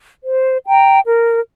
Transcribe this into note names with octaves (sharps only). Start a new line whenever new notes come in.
C5
G5 A#5
A#4